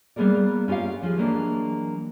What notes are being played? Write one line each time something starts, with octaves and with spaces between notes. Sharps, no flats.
G3 A#3 B3 G#4 A#4 D5
C#4 F4 G4 A#4 F5
F3 F4 G#4
E3 F#3 G#3 A#3 D4